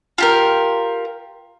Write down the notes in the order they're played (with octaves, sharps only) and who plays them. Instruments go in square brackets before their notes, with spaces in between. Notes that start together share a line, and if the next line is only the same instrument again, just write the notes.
[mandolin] F4 G4 A#4